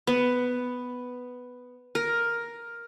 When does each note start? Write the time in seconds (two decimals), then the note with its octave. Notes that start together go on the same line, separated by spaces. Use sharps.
0.07 B3
1.95 A#4